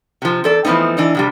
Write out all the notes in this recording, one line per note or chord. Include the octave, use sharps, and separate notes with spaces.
C3 F3
E2 A4 D5
E3 F3 A3 B3 C4 D#4
E3 D4 D#4
F2 C3 G3